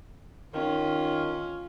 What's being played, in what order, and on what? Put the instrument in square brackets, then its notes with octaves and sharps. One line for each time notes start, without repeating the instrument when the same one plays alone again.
[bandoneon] D#3 [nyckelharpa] C#4 F4